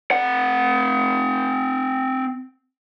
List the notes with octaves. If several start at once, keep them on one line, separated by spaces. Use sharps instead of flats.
C4 F#5